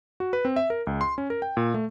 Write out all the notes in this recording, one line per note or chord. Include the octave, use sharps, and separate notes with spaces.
F#4
B4
C4
E5
A#4
C#2
C6
C#4
A#4
G5
A#2
A3